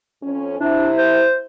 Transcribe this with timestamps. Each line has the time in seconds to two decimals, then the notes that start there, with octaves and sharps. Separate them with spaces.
0.23 F2 C#4
0.60 C3 D4 E4
0.98 C5